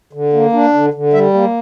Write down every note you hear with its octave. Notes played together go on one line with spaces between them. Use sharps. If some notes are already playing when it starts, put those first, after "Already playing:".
D3
A#3
D4
D3
D3
G3 E5
A#3